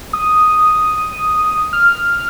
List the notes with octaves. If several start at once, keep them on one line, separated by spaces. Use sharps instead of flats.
D#6
F6